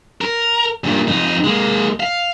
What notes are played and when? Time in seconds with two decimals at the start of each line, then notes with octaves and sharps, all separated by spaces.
0.21 A#4
0.84 G2 A#2
1.07 F2 D#4
1.44 G#3 A#3
2.00 F5